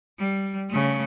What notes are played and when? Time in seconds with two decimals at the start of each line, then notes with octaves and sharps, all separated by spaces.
0.18 G3
0.69 C#3 A3